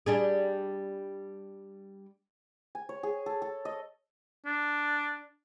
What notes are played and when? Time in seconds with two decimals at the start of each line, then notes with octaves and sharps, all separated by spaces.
0.06 G3 D4 G#4
2.75 G#5
2.89 C#5
3.03 G#4
3.26 A4
3.42 A4
3.65 D#5
4.46 D4